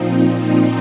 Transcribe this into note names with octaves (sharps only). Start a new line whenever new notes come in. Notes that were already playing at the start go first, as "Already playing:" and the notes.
Already playing: A#2 F3 C4 D#4
A#2 F3 C4 D#4